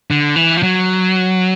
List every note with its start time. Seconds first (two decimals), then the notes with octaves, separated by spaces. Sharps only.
0.11 D3
0.36 E3
0.57 F3
0.63 F#3